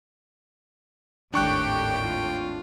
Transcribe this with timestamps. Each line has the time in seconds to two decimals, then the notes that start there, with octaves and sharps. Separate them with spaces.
1.34 G#1 D#2 A2 D4 G4 G5 C#6 F#6
2.05 F4